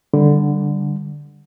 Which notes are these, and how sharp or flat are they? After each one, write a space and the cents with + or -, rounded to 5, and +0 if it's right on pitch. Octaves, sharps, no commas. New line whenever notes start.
D3 +0 G3 +0